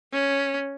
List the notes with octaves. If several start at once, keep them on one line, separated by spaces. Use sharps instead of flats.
C#4